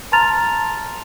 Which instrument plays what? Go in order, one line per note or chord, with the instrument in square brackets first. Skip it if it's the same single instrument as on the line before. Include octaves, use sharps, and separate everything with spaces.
[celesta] A5 A#5 C6 F6 A6 F7